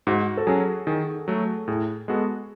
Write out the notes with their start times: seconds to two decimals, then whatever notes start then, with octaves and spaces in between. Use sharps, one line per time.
0.07 G#2 F#4
0.37 A4
0.47 F#3 C#4 G#4
0.87 D#3 G#4
1.28 F#3 A3
1.68 A2 G#4
2.08 G#3 B3 F#4 A4